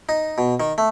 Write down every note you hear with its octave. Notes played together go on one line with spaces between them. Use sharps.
D#4
B2
D#3
A3